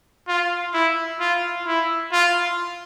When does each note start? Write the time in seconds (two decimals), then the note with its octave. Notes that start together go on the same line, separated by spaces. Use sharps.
0.28 F4
0.74 E4
1.20 F4
1.67 E4
2.12 F4